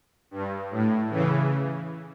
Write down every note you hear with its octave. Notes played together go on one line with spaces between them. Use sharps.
G2
A2
C#3 E3